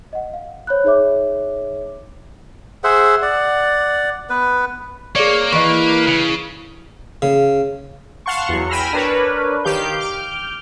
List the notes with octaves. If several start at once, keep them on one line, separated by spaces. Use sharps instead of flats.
D#5 F#5
F5
C5 C#5 B5 F#6
D#4 G#4 C#5 E5 D6
G#4 C5 E5 F#5
D5 F#5
B3 B4
A#3 G#4 C#5 D5
E3 B4 D#5 F5 C#6
C#3
C#3
F5 F#5 A5 C6 C#6
E2 F#3
G5 G#5 B5 E6 F6 A#6
D4 A#4 B4 C#5
D#3 G4 F5 G6
D6 F6 G6